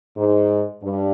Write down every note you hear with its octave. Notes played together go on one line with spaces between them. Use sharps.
G#2
G2